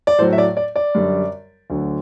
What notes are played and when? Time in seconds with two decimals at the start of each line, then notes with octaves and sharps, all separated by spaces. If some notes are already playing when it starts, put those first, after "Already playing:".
0.07 D5
0.19 A2 C5
0.22 F#3
0.33 E5
0.38 D5
0.57 D5
0.76 D5
0.94 F#2 D3 G3
1.70 D2 D3 F#3